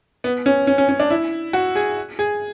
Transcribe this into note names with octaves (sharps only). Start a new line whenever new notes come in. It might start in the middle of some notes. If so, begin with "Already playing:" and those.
B3
C#4
C#4
C#4
C#4
D4
E4
F#4
G#4
G#4